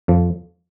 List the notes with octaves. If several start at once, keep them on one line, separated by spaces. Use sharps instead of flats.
F2 F3